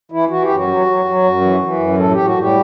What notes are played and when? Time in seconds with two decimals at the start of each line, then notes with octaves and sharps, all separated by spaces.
0.12 E3 E4
0.30 E3 F#4
0.43 G4
0.49 F#2
0.56 F#3 F#4
0.67 F#3
0.86 F#3
1.05 F#3
1.24 F#2
1.41 E3
1.61 E3
1.79 F#2
1.98 A2 A4
2.12 A2 G4
2.25 F#4
2.35 A2 G3 G4